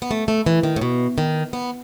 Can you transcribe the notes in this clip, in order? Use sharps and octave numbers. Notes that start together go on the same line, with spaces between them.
B3
A3
A3
E3
D#3
A2
B2
D#3
B3